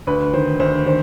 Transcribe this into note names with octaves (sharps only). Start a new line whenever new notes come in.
D2 B4
D#3 C5
D2 C5
D#3 C5